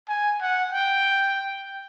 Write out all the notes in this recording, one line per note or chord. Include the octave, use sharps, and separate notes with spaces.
G#5
F#5
G5